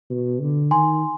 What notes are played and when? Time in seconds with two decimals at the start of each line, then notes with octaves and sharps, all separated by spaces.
0.10 B2
0.41 D3
0.71 D#3 G#5 C6